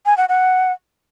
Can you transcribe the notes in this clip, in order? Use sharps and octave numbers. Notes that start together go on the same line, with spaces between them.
G#5
F#5
F#5